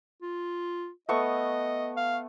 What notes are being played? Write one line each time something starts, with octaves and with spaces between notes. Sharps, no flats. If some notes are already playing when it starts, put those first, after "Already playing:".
F4
A3 B3 D#5 C#6
F5